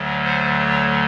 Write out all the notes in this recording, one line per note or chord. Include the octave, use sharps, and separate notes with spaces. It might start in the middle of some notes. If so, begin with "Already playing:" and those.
Already playing: D2 D3 F#3 A3
C5
C#5